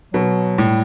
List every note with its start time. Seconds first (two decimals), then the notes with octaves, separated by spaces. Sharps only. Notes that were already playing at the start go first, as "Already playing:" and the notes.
0.13 B2 F#3
0.58 A2 G3